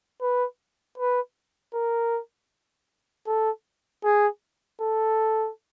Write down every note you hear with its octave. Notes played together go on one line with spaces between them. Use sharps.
B4
B4
A#4
A4
G#4
A4